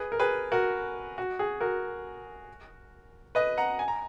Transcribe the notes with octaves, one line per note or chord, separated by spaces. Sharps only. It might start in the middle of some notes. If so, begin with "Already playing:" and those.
Already playing: G#4 B4
A#4
G#4 B4
F#4 A#4
F#4
G#4
F#4 A#4
B4 D#5
F#5 A#5
G#5
A#5